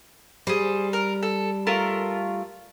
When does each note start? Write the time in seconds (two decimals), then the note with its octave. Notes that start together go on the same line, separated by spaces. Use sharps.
0.47 G3 G#4 C5
0.93 A#4
1.23 A4
1.67 A3 F4 A#4